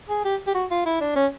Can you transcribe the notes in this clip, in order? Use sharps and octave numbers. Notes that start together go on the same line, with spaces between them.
G#4
G4
G4
F#4
F4
E4
D4
C#4